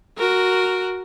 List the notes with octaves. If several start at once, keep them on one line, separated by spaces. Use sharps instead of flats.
F#4 A#4